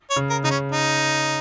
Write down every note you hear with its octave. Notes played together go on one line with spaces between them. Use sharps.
C#5
C#3
A#4
C#3 D#4
C#4
D#4